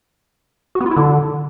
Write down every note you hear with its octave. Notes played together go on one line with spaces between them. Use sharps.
F#4
B3
F4
E4
D3